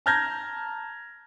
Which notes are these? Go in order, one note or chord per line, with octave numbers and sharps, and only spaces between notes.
A5 A#5 F6 G6 G#6 A#6